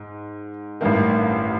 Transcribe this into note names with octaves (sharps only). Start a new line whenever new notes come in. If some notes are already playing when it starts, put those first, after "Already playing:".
Already playing: G#2
A1 G2 D#3